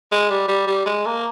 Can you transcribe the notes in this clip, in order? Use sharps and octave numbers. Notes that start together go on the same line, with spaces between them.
G#3
G3
G3
G3
G#3
A#3